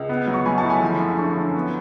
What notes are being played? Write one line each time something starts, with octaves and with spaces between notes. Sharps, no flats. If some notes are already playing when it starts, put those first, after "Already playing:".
Already playing: C#2
B3
F#3
C#6
F#3 G#5 B5
A5 C#6
A2
G#5 B5
F3
F#2
D3 A5 C#6
F#2
B3